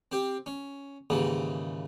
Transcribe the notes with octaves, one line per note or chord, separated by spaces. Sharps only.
C4 G4
C#4
D#2 G#2 C#3 E3